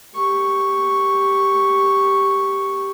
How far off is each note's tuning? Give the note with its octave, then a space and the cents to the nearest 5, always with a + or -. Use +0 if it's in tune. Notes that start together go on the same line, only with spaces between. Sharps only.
G4 +0 C#6 +0